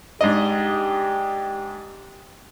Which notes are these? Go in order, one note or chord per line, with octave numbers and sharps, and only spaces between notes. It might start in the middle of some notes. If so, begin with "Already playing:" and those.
G#2 D4 G4 D#5